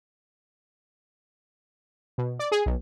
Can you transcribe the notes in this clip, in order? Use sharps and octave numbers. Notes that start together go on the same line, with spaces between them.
B2
D5
G#4
B1